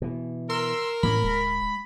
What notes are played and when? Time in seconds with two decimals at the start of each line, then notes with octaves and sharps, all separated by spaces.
0.02 B2 E3
0.50 A#4 C6 E6
1.03 A2 E3 A#3 C#4 B5
1.23 D1 G#3